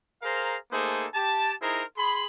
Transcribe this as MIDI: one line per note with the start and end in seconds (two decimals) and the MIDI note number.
0.22 0.56 68
0.22 0.56 70
0.22 0.56 72
0.22 0.56 77
0.22 0.56 82
0.71 1.06 57
0.71 1.06 58
0.71 1.06 63
0.71 1.06 68
0.71 1.06 69
0.71 1.06 72
1.14 1.54 67
1.14 1.54 81
1.62 1.83 63
1.62 1.83 64
1.62 1.83 68
1.62 1.83 70
1.62 1.83 72
1.62 1.83 82
1.96 2.26 68
1.96 2.26 83
1.96 2.26 84